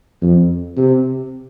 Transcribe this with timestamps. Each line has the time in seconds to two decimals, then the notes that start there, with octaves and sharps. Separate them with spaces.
0.22 F2
0.77 C3